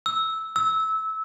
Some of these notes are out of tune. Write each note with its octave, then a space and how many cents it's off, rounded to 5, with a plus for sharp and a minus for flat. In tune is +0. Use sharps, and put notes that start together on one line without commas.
E6 -10
E6 -20